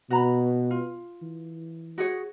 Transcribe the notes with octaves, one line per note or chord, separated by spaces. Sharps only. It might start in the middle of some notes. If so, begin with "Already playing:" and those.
B2 F#4 A#5 B5
F4
E3
F#4 G#4 C#5